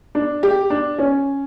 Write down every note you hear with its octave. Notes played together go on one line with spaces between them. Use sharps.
D4
G4
D4
C#4